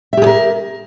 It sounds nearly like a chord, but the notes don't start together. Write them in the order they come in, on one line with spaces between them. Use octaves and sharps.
E5 G4 G#4 A#4